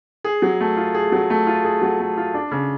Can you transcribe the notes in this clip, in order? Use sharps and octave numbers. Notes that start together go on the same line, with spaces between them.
G#4
F#3
A3
F4
G#4
F#3
A3
F4
G#4
F#3
A3
F4
D4
C#3